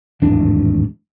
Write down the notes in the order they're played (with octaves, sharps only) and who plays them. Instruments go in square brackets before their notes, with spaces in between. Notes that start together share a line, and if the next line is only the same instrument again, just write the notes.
[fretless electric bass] D1 G#1 E2 D4